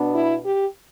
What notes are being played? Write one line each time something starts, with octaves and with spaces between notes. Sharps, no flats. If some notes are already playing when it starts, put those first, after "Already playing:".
Already playing: B2 B3 D4
E4
G4